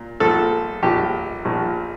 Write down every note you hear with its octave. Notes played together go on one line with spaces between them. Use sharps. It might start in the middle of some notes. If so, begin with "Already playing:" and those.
Already playing: A#2
A#1 A#2 F3 A4
A#1 A#2 F3 G4
A#1 A#2 F3